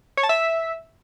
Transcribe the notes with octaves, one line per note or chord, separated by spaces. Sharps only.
C#5
A5
E5